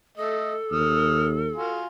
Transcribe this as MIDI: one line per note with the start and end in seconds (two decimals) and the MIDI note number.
0.17 0.55 57
0.17 1.77 69
0.17 0.55 75
0.72 1.52 39
0.72 1.26 87
0.72 1.26 89
1.56 1.86 65
1.56 1.86 66
1.56 1.86 80